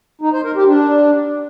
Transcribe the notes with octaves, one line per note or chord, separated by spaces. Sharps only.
D#4
C5
A#4
G4
D4